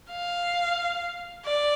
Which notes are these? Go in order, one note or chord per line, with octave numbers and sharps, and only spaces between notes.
F5
D5